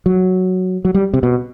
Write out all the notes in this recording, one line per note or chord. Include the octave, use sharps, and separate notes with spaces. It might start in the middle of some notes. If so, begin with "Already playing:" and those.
F#3
F#3
G3
C3
B2